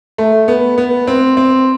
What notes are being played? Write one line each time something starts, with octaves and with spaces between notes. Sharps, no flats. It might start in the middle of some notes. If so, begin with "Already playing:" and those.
A3
B3
B3
C4
C4